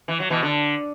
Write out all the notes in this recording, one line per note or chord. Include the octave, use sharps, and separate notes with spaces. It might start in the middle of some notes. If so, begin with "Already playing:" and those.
E3
F#3
B2 E3
D3